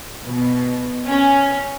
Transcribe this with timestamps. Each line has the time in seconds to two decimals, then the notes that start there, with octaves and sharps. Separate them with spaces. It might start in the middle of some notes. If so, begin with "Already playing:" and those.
0.23 B2
1.06 C#4